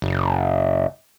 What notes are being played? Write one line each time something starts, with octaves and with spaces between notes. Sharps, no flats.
F#1